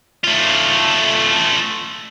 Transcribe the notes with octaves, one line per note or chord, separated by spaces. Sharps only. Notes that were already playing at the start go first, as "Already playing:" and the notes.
A3 F4